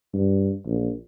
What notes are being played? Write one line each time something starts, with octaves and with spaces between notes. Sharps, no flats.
G2
A#1